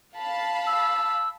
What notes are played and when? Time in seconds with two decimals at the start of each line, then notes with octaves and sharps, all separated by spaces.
0.16 F5 A5 B5
0.67 E6